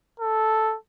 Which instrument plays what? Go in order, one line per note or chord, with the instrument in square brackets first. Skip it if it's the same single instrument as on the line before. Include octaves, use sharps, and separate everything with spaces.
[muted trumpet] A4